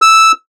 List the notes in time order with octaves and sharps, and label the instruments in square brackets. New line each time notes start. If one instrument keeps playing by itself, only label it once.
[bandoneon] E6